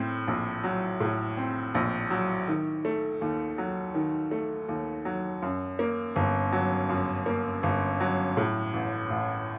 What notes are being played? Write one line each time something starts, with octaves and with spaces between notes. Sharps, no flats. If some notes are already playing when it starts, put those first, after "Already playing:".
Already playing: A2 C4
A#1
F#3
A2
C4
A#1
F#3
D#3
A3
D#2
F#3
D#3
A3
D#2
F#3
F#2
A#3
G1
F#3
F#2
A#3
G1
F#3
A2
A1
A1